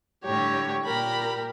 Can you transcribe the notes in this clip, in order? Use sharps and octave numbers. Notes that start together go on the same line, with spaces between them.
A2 D3 G3 G4 C#5
A#2 G4 A#4 B5